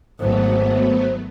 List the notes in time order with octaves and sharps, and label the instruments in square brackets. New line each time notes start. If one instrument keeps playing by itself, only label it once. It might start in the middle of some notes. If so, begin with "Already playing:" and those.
[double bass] G#1 G#2 [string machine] F#3 A3 B3 [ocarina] C5